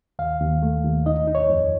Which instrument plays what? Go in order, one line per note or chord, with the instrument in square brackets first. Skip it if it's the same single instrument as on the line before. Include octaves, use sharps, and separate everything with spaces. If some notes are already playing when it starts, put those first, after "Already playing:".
[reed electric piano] D#2 F5
D#2
A3
D#2
D#4 D#5
D#4
C#5
F2